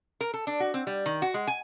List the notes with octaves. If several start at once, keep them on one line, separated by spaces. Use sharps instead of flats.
A#4
A4
D4
F#4
C4
G3
D#3
F#4
G#3
G#5